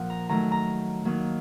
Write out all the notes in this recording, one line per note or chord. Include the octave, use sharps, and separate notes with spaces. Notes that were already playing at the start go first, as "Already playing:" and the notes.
Already playing: A#2 F3 F#5
A#5
D#3 F#3 A3 A#5
A#5
D#3 F#3 A#3